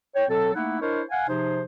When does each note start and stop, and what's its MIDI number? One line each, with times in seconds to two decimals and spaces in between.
0.16 0.25 73
0.16 0.25 79
0.29 0.51 47
0.29 0.51 54
0.29 0.51 60
0.29 0.51 69
0.55 0.80 57
0.55 0.80 58
0.55 0.80 63
0.55 0.80 64
0.55 0.80 78
0.82 1.02 62
0.82 1.02 64
0.82 1.02 70
0.82 1.02 72
0.82 1.02 73
0.82 1.02 75
1.11 1.27 77
1.11 1.27 78
1.11 1.27 80
1.28 1.62 48
1.28 1.62 53
1.28 1.62 63
1.28 1.62 68
1.28 1.62 72